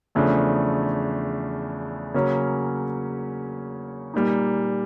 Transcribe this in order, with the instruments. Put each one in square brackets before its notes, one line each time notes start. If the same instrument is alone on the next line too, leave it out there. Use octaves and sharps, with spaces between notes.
[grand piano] E2 C#3 F3 A3 D4
C#3 F#3 A#3 C#4
A#2 G3 A#3 D#4